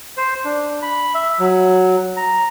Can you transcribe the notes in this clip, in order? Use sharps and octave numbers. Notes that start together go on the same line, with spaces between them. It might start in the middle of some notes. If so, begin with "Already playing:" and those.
C5
D4
B5
E5
F#3
A#5